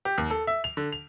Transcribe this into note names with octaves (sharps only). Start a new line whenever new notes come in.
G4
D#2
A4
E5
F7
D3
F7